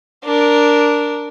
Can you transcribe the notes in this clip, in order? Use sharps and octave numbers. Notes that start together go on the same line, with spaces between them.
D4 A#4